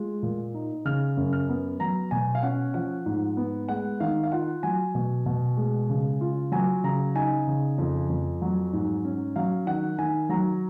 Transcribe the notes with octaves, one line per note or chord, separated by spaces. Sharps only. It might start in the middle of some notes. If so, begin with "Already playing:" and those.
Already playing: G#3 F4
A#2
D#4
C#3 F6
F#2
F6
B3
F#3 A#5
B2 G#5
F5
C#4 F#5
F3 F#5
G#2
B3
G#3 F#5
D#3 F5
F5
F4 F#5
F#3 G#5
B2
B2
G#3
C#3
F4
F#3 G#5
C#3 A#5
D#4 G#5
C#3
F2
F2
F#3
G#2
C#4
F#3 F5
D#3 F#5
D#3 G#5
F#3 A#5